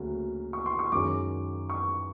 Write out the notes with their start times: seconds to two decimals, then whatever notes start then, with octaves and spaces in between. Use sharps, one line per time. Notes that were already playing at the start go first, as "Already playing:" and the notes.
Already playing: D2 C#3 F#3 A#3
0.53 C#6
0.66 C6
0.79 C#6
0.92 F#2 D#3 G#3 C#4 D6
1.70 C#6